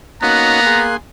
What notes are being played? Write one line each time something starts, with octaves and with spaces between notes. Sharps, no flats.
A#3 B3 C#4 D#4 F#4 A#5 F#6
G#4 C6